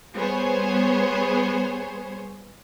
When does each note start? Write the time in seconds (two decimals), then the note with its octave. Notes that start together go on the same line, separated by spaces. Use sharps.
0.16 G3 B3 G#4 C5 C#5